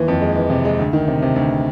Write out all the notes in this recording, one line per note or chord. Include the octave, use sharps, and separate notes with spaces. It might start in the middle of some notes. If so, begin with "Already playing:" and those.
Already playing: D#2 E3
F2
G#3
E3
C3
G#3
D2
D#3
C3
C3
D2